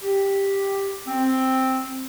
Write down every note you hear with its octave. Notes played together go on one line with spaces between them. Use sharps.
G4
C4